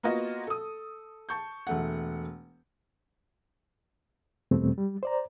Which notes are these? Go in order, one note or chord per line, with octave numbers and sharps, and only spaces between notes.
A#3 B3 F4 F#4 D#5
A4 D#6
A5 C#6 G6
E1 A3 F#5
E2 B2 G3 A3 C4
G3
C5 D5 A#5